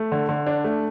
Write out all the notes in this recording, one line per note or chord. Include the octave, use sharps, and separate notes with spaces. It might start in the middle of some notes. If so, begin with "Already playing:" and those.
Already playing: A3
D3
D3
D4
A3